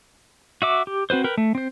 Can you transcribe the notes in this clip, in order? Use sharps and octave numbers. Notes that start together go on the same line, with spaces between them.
F#4 E5 D6
G4
C4 F#4 B4 C5
A#4 B4 G5
A3
C4 C5